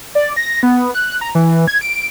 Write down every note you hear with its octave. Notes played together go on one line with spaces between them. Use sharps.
D5
A#6
B3
F#6
A#5
E3
G#6
D7